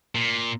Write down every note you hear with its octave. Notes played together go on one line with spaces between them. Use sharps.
A#2